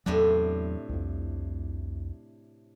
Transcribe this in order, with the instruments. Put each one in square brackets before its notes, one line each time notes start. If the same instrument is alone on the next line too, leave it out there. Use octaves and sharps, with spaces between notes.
[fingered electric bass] E2 F#3 [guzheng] A2 C3 D4
[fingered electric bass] C2 F2